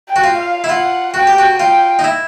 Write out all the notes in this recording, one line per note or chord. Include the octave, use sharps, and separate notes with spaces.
G5
F#4
F4
F5
E4
F4 F#5
F#4 G5
G4
F#4
F4 G5
D#4
E4